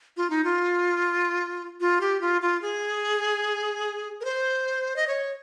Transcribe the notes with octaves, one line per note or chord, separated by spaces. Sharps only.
F4
D#4
F4
F4
G4
F4
F4
G#4
A#4
C5
D#5
C#5